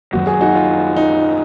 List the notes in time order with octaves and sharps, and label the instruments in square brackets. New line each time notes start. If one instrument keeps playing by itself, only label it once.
[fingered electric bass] F#2 D#3 F#3 A#3 [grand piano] F#4
[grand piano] G#4
D#4 F#4
F4
D#4